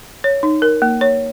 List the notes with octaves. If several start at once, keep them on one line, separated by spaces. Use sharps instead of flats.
C#5
D#4
A#4
A#3
C#5